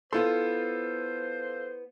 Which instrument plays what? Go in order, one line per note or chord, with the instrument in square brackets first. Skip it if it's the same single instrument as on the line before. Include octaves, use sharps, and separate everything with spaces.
[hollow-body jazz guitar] B3 E4 C6 [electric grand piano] F4 A4 [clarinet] C5